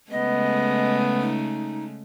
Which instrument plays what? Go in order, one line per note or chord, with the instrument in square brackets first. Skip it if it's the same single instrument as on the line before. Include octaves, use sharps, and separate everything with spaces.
[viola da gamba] C#3 G#3 A3 [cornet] B3 [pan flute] D#5
[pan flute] D#4